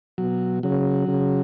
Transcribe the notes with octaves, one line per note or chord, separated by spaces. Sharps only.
B2 F#3
C#3 F#3
C#3